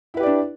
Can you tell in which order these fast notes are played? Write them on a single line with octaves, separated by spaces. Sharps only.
E4 B4 G4 D5 D4